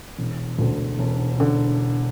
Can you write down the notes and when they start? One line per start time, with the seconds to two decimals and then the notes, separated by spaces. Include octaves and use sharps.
0.18 E1
0.59 D2 D3
0.99 E1
1.40 D3